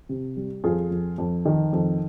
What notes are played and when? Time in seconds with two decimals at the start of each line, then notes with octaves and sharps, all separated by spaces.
0.09 C3
0.37 G3
0.64 F2 F4 G#4
0.91 F2
1.18 F2
1.45 D#3
1.73 F2